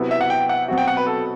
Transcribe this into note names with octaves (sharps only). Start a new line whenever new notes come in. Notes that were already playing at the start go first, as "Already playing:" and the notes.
Already playing: C3 F#3 B3 E4
E5
F#5
G5
F#5
B2 F#3 C4 F#4
G5
F#5
B4
A4